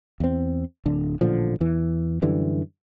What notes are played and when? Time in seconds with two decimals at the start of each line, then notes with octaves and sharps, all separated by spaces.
0.20 E2 C4
0.86 D1 D3
1.21 A1 A#2 D3 F3
1.60 E2 E3
2.22 F#2 D3 E3 G3